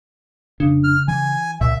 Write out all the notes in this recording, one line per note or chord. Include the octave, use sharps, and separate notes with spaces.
F1 C#3 D4
F6
E3 G#5
C#2 A#2 E5